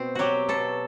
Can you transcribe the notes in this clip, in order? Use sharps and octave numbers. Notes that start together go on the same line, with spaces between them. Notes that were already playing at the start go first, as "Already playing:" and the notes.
Already playing: B2 C4
F#3 F#4 G4
B2 A4